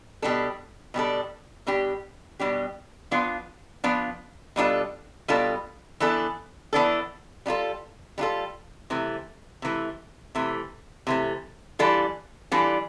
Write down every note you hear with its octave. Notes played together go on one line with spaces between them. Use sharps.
B2 G3 D4 A4
B2 G3 D4 A4
B2 G3 D4 G4
B2 G3 D4 G4
F3 B3 D4 F4
F3 B3 D4 F4
B2 G3 D4 F4 A4
B2 G3 D4 F4 A4
E3 B3 D4 A4
E3 B3 D4 A4
G3 D4 F4 A4
G3 D4 F4 A4
C3 E3 A3
C3 E3 A3
C3 E3 A3
C3 E3 A3
E3 G3 D4 F4 A4
E3 G3 D4 F4 A4